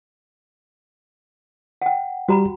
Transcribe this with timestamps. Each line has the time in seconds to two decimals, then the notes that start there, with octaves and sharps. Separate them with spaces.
1.82 F#5 G5
2.29 G3 F#4 G4 A#5 B5